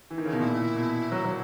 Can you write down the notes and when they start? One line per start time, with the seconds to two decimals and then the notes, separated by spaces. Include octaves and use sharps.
0.10 E3
0.18 D#3
0.25 C#3 D#4
0.32 B2
0.40 A#2 E4
0.76 B2
1.12 F#3
1.25 F#3